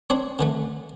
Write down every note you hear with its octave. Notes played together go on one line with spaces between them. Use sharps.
C4 D4 C#5
D3 E3 A3